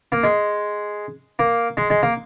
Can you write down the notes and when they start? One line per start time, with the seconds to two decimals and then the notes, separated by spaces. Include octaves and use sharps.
0.12 A#3
0.23 G#3
1.39 A#3
1.77 G#3
1.90 G#3
2.03 A#3